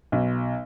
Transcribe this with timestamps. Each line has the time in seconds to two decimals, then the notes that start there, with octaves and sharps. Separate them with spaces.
0.12 B1